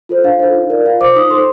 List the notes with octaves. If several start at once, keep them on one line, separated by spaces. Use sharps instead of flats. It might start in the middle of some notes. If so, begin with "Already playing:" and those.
F4 A4 C5
D4 F5
F4 A4 C5
D#4
A#4 D5
F4 F5
C5 D6
D#4 D#6
A4 C5 C6